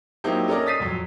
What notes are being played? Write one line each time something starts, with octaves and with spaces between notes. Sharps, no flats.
F#3 A#3 C4 D#4 E4 G4
C#4 A4 A#4 D5 D#5
D#6 A6 B6 C7 D#7
F2 F#3